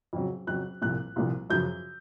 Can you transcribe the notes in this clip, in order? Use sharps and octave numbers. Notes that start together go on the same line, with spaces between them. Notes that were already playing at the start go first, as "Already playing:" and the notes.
F2 C#3 F#3
F2 C#3 F#3 F#6
C2 A#2 F3 F#6
C2 A#2 F3
F#2 C#3 F3 G6